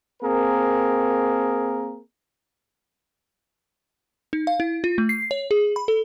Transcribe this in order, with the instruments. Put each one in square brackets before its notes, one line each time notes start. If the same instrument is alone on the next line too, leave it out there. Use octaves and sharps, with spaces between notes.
[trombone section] A#3 C4 G#4 A#4
[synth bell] D#4
F5
E4
F4
A3
C7
C#5
G#4
B5
A4